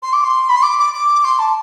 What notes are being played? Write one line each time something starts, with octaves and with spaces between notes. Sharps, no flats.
C6
D6
C6
B5
C6
D6
D6
D6
C6
A5